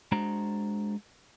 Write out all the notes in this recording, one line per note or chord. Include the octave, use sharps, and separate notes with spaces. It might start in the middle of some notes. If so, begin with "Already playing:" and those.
G#3 D4 F#4 C5 A#5